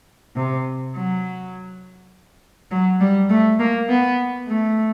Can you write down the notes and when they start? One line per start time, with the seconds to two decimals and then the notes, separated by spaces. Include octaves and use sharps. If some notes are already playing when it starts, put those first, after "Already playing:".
0.36 C3
0.95 F#3
2.71 F#3
3.01 G3
3.30 A3
3.59 A#3
3.89 B3
4.47 A3